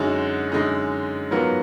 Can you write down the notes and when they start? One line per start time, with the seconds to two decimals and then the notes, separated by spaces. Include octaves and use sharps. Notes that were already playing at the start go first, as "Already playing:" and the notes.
Already playing: F#2 D3 G#3 D#4 F#4
0.52 F#2 D3 G#3 D#4
1.31 G#2 F#3 B3 F4 A#4